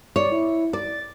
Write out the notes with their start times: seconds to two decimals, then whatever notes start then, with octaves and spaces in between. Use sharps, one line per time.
0.16 C#5 D5
0.32 E4
0.73 D5 A6